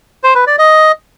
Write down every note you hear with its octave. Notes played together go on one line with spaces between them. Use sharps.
C5
B4
D5
D#5